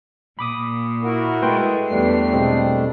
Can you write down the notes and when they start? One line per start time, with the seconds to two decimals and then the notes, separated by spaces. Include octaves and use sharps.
0.39 A#2 B5 D6 D#6
1.03 E4 F#4 A#4
1.42 G#3 A3 B4 G5 C6
1.89 E2 G3 A3 D4 C7
2.33 B2 G#3 C4